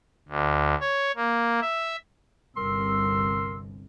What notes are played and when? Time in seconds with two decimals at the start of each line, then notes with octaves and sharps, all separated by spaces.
0.29 D2
0.80 C#5
1.16 A#3
1.61 E5
2.57 G1 C2 A#4 C6 E6